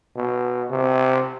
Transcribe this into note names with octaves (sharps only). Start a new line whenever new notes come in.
B2
C3